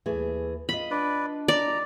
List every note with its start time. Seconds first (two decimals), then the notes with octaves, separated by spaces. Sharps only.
0.06 D#2 E3 A3 G#4
0.69 F4 D#5 B5
0.91 D4 B4 D5
1.48 D5 A#5